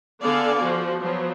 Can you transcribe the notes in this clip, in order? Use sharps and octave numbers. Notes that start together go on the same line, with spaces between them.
D3 B3 A4 D5 F5 G#5
F3 F#4
F3 F#3 B3